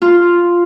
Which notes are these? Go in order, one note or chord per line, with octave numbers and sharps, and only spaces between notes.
F4